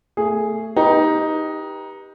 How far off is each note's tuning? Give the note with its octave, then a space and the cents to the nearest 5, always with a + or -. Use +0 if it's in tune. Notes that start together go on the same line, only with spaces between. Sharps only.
A3 +20 G#4 +0
D#4 +10 G4 +10 B4 -25